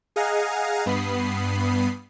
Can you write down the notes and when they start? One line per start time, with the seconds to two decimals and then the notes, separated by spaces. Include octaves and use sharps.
0.16 G#4 D#5 F5 F#5 G#5 A#5
0.86 G2 B3 B5 D#6 C7